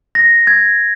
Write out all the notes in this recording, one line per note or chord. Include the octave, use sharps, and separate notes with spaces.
A#6
G#6